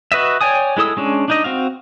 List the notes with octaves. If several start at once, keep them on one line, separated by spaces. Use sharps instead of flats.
F#4 B4 D#5 E5
C#5 D5 G5 G#5 D#6
G#3 E4 A4 D#6 E6
G#3 C#4 D4
D4 D#4 D#5
C4 F#4 F5